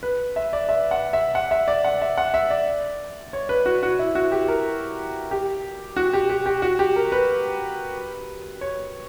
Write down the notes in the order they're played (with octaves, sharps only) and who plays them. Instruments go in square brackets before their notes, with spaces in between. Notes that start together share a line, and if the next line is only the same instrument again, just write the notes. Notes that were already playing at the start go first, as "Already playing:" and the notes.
[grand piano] B4
E5
D5
E5
F#5
E5
F#5
E5
D5
F#5
E5
F#5
E5
D5
C#5
B4
F#4
F#4
E4
F#4
G4
A#4
G4
F#4
G4
G4
G4
F#4
G4
A#4
B4
C#5